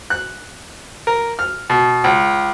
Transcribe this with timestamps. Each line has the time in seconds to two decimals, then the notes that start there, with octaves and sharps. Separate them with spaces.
0.10 F#6
1.07 A#4
1.39 F6
1.70 B2
2.04 C#2